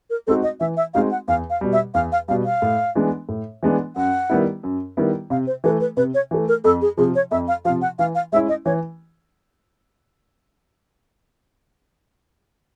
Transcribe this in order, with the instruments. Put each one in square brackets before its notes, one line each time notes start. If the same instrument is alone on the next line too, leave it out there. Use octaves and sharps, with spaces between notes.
[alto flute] A#4
[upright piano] G#3 C4 D#4 F#4 [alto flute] A4
[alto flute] D#5
[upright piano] E3 [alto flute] E5
[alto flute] E5
[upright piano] G#3 C4 D#4 F#4 [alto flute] F5
[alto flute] F#5
[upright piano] E2 [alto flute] F5
[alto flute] F5
[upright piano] B2 G3
[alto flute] E5
[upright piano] E2 [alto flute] F5
[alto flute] F5
[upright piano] B2 G3 [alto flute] F5
[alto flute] F5
[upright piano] A2
E3 G#3 B3 D4
A2
E3 G#3 B3 D4
[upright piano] F#2 [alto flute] F#5
[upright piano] D#3 G3 B3 E4
F#2
D#3 G3 B3 E4
[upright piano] C3 [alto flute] F5
[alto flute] C5
[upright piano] E3 A3 [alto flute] B4
[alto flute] B4
[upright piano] C3 [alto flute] B4
[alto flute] C#5
[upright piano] E3 A3
[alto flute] A#4
[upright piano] F2 [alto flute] A4
[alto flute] G#4
[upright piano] C3 F3 [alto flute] G#4
[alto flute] C#5
[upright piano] F2 [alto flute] E5
[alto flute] F5
[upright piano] F3 [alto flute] F5
[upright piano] C3
[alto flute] F#5
[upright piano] E3 [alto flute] F5
[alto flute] F5
[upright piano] G#3 C#4 E4 [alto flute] E5
[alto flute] D#5
[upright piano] E3 [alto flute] C#5